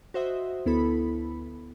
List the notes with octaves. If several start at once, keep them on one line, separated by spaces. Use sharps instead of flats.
F#4 C5 D#5 E5
D2 B3 E4 A4 B5